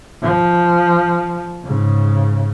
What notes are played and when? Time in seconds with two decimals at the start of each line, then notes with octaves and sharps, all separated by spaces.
0.22 F3
1.64 G#2 C#3